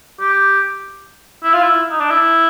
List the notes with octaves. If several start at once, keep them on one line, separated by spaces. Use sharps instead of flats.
G4
E4
F4
E4
D#4
D4
E4